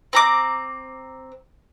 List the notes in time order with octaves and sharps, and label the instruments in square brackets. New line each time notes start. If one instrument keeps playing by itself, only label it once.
[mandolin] C4 A#5 D6